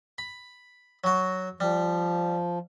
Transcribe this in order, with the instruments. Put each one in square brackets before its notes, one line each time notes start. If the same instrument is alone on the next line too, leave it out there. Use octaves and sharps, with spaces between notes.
[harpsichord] B5
F#3 F#4
[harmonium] F3 [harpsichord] G3